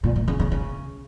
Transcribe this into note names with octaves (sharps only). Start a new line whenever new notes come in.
A#2
A2
C#3
C#3
C#3